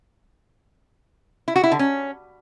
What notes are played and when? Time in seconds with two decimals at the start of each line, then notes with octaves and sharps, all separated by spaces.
1.48 E4
1.56 F#4
1.64 E4
1.71 D3
1.79 C#4